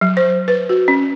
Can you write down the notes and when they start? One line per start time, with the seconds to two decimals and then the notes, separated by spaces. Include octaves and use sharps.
0.01 F#3
0.17 C5
0.48 B4
0.69 F#4
0.88 C#4